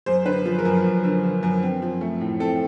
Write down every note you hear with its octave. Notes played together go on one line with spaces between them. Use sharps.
F#2 C5
D3 B4
C5
F3
A#4
F#2
F#2
D3
F3
F#2
C4
F3
A3
A2
C4 A4